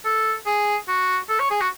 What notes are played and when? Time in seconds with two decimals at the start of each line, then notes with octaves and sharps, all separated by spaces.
0.05 A4
0.46 G#4
0.88 F#4
1.29 A4
1.39 C#5
1.51 G#4
1.61 F#4